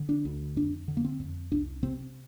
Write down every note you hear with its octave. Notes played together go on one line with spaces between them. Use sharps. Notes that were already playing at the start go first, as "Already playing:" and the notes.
Already playing: D3
D4
D2
F2 D4
D3
A#3
C4
F2
C2 D4
C3 C4